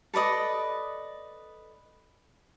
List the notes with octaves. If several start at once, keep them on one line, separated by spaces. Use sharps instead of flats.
A4 B4 D5 D#5